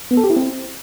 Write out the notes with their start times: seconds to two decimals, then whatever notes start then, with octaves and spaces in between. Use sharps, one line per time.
0.11 B3
0.17 A4
0.24 G4
0.30 E4
0.36 C4